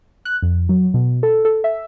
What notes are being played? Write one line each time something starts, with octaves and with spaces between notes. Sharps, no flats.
F#6
F2
F#3
B2
A4
A4
E5